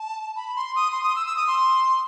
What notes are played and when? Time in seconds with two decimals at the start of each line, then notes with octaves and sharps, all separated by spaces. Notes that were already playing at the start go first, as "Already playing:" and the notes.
Already playing: A5
0.36 B5
0.56 C6
0.76 D#6
0.92 C6
1.03 D#6
1.16 E6
1.26 E6
1.37 D#6
1.47 C6